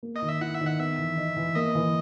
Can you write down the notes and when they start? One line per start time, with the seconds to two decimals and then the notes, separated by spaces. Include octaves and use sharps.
0.03 A#3
0.16 D#5
0.22 D#3
0.28 E5
0.41 E4 F#5
0.54 E5
0.61 D#3
0.66 F#5
0.79 B3 E5
0.98 E3
1.17 D#4
1.37 E3
1.55 A#3 D#5
1.75 E3